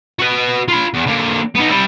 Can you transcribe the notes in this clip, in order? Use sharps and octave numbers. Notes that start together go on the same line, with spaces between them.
F#4 B4
F4 B5
E2
D3 A#3
B3 D#4
G3 E4